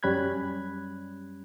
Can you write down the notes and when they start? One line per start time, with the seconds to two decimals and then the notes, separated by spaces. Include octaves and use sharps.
0.03 F#2 G3 C#4 B5 F#6 G#6